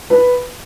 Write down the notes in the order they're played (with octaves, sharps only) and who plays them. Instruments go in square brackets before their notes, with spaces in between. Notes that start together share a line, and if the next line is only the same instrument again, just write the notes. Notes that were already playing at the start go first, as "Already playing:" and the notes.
[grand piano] B4